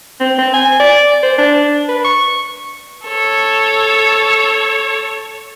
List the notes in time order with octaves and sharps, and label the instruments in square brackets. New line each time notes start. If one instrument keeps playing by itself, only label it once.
[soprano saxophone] C4
C4
G#5
D5
C5
D4
B4
C#6
[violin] A4 C#5